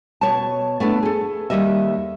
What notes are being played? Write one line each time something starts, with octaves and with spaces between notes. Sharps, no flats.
B2 C#5 A5
A3 B3 D4 E4
G#4 A4
D#2 F#3 G3 D#5 E5